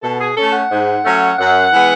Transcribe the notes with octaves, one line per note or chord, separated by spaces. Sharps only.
B2 A4
G#4
A3 C#4 A4
F#5
G#2
F#3 A3 C#4
F#2 F#5
E3 G#3 B3